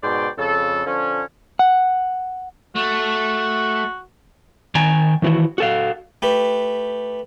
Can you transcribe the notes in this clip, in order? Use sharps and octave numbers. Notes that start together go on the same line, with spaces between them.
G#2 B2 D5 G5 C6
F2 C#3 A4
D3 F3 C#4
F#5
A3 F#4
D#3 G5 G#5 A#5
D#3 E3 F#3 E4 F#4
F#4 A4 F5
A3 G4 B4